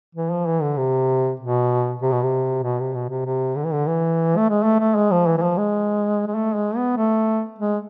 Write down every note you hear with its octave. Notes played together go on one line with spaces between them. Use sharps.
E3
F3
E3
D3
C3
B2
C3
B2
C3
B2
C3
B2
C3
C3
D3
E3
D3
E3
A3
G#3
A3
A3
G#3
F3
E3
E3
F3
G#3
G#3
A3
G#3
B3
A3
G#3